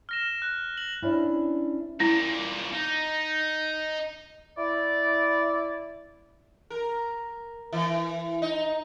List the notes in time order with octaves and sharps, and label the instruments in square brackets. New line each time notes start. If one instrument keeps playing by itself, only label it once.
[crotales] F6 A#6 E7
F#6
F#7
[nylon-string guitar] C#4 D4 E4 C5 C#5
[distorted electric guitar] A#2 G3 [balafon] E4
[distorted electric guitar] D#4
[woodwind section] E4 D5
[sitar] A#4
E3
D#4